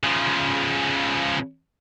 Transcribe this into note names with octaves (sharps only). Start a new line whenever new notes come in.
C#3 F3